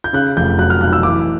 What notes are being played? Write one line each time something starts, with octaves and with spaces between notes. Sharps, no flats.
G6
C#3 F#6
F1 G6
F#3 F#6
F6
B1 F#6
E6
E3 D6